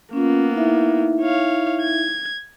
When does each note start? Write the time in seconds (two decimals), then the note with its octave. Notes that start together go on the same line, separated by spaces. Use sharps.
0.13 A#3 B3 C#4 F4
0.55 D#4 E4 E5
1.21 C#5 F5
1.82 G#6